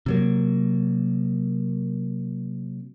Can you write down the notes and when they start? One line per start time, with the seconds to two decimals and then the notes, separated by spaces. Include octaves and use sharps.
0.06 C3 F#3 A#3